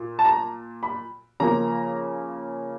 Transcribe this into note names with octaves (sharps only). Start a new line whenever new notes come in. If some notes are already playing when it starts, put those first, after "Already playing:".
Already playing: A#2
A5
A#5
B5
C#3 F3 A#3 A#5